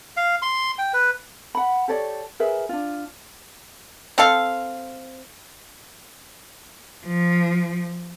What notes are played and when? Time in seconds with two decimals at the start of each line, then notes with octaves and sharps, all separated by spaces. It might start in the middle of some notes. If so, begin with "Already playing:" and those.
0.17 F5
0.42 C6
0.78 G5
0.94 B4
1.55 F#5 B5
1.88 G4 A4 C#5 D5
2.40 G#4 A#4 B4 E5
2.69 D4 F4
4.18 C4 A4 F5
7.07 F3